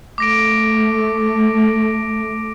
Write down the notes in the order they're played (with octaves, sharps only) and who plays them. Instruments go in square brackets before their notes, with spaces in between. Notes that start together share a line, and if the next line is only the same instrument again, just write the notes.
[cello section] A3 [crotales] D6 A#6 D7